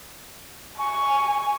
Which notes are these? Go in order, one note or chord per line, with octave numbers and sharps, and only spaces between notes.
G#5 C#6